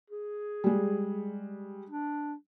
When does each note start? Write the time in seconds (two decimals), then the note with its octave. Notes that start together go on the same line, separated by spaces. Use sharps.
0.10 G#4
0.64 G3 G#3
1.89 D4